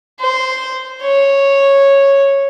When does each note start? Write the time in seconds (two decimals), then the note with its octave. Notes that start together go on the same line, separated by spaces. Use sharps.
0.20 C5
1.03 C#5